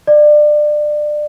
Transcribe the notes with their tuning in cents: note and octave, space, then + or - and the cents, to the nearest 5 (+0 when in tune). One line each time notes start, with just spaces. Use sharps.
D5 +25